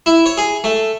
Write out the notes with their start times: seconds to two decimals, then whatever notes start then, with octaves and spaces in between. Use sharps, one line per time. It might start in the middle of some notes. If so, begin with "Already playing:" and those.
0.06 E4
0.26 C#5
0.37 G#4
0.64 A3